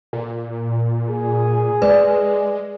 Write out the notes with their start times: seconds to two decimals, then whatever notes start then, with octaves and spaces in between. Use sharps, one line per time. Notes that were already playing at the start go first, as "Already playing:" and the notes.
0.13 A#2
1.09 G#4
1.82 G#3 B4 D5